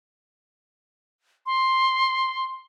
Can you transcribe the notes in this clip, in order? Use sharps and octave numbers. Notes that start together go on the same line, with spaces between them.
C6